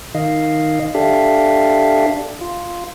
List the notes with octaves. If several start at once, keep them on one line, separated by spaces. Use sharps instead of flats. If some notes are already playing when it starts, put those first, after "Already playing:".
D#3 D#5 F5
D4 G4 A4 E5 F5
F4